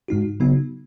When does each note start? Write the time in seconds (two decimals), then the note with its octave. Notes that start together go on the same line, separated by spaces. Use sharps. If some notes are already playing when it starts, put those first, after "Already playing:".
0.08 G#2 G#3 D#4 F#4
0.40 C#3 F#3 B3 D#4 F#4